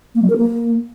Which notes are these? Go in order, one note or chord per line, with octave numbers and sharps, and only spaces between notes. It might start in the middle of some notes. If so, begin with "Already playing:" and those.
A#3
F#3
A#4
A#3